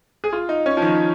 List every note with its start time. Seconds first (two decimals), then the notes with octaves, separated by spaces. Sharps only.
0.24 G#4
0.33 F4
0.49 D#4
0.66 C#4
0.77 F3
0.82 D#3